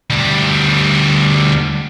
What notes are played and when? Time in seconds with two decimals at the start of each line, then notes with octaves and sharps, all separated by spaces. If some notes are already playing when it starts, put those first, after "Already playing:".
0.10 D2 G3